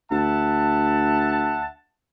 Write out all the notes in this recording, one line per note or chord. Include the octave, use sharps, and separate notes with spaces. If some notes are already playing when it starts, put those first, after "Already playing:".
D2 E5 F#5 A5